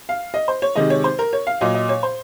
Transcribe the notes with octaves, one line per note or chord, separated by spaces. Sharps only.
F5
D#5
C5
C#5
C3 D#3 G#3 D#5
C#5
C5
A#4
C#5
F5
A#2 F#3 D#5
D#5
C#5
C5